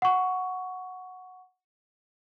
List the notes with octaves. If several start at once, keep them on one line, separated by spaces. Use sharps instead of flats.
F#5 C#6